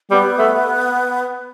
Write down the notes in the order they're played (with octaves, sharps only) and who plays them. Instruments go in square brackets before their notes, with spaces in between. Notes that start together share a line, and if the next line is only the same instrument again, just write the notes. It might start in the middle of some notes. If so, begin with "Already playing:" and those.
[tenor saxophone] G3 [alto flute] B3
[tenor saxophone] A3